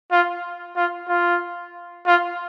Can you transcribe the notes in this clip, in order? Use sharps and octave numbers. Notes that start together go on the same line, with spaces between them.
F4
F4
F4
F4